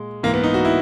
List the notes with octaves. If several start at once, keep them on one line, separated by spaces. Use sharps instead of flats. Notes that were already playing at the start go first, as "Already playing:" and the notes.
Already playing: A#2 G#3
G#2 E3 A#3
B3
D#4
F#4
E4